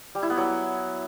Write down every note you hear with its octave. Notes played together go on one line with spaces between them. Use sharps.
G3
E4
B3
F#3